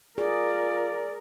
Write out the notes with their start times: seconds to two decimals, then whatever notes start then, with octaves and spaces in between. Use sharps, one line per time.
0.18 F4 G#4 A#4 D5